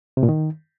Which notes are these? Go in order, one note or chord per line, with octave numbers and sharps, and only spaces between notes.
C3
A#2
D#3